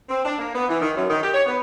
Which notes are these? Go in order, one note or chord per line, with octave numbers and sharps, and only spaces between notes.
C4
D4
A#3
B3
E3
D#3
F#2
D#3
G4
C#5
B3